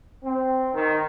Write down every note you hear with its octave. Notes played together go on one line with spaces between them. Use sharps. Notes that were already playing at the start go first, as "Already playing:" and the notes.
C4
D#3